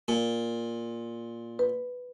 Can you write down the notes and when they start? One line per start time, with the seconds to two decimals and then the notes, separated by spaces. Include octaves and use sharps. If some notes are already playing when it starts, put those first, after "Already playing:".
0.08 A#2
1.59 B4